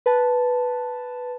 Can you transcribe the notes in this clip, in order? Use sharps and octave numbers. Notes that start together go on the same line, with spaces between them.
B4 A5